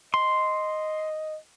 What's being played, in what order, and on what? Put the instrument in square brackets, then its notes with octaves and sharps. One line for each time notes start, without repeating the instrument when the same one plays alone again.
[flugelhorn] D#5 [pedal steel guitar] C6